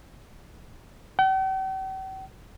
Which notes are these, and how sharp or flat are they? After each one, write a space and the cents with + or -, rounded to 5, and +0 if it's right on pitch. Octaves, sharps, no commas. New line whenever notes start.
G5 -45